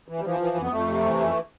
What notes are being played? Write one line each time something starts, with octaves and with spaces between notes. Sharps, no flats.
E3
G3
E3 F3
E3
F2 B3
F2 A3
C3
E3
F2